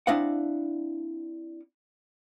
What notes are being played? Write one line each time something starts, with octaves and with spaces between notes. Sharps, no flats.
C4 D4 E4 D#5 F5 F#5